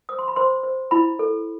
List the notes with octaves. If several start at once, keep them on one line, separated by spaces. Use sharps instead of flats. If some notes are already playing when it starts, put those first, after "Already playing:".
C5 D#6
C6
B5
C5 C6
C5
E4 B5
A4